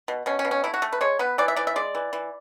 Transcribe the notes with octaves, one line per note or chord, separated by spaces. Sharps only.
B2
B2 C#4
C#4
B2
C#4
A3 E4
F#4
A3
B4
G#3 C#5
B3 B4
E3 D5
E5
E3 D5
E5
G#3 D5
E3
E3